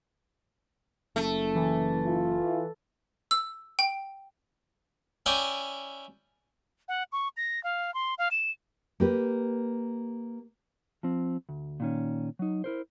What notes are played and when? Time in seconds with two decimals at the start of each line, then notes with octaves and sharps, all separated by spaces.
1.16 F#1 A3
1.55 E3
2.05 E4 F4
3.31 E6
3.79 G5
5.26 C#4 E4 D5 G5 D#6
6.88 F#5
7.12 C#6
7.37 A#6
7.64 F5
7.94 C6
8.18 F5
8.31 E7
9.00 A#3 G4 B4
11.03 F3 C4
11.49 D2
11.80 A#2 D#3 C#4
12.39 F#3 D#4
12.64 E4 A#4 C5